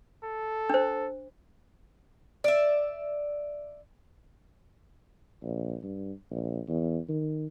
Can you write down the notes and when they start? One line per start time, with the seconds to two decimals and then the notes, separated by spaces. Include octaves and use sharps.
0.24 A4
0.70 D4 C5
2.44 D5 E5
5.43 A#1
5.83 G2
6.31 A#1
6.68 E2
7.09 D#3